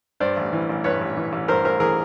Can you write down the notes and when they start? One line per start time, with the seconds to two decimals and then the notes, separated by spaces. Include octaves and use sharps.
0.20 G2 C5 D5
0.37 A1
0.53 E3
0.70 A1
0.84 G2 B4 C#5
1.01 A1
1.17 E3
1.33 A1
1.48 G2 A#4 C5
1.65 A1 A#4 C5
1.80 E3 G#4 A#4